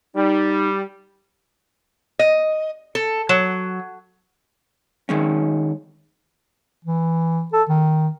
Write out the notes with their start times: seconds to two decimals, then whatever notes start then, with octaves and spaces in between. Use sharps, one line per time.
0.15 G3 D#4
2.19 D#5
2.95 A4
3.29 F#3
5.09 D#3 G#3 C#4
6.85 E3
7.53 A4
7.69 D#3